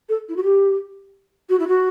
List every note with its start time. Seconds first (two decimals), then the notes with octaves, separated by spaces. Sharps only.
0.09 A4
0.29 E4
0.36 F#4
0.43 G4
1.49 F#4
1.59 E4
1.67 F#4